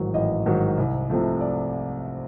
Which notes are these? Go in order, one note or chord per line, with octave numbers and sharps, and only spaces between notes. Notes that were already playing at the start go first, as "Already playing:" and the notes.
Already playing: A1 G#2 D#3 F#3
A1 D#5
G#2 D#3 F#3
C2
C3 F3 A3
D5